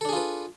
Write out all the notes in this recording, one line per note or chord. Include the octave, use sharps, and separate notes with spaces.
D4 F4 G#4 A4 B4